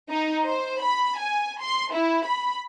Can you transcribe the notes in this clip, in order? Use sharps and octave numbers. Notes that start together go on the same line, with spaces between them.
D#4
C5
B5
G#5
C6
E4
B5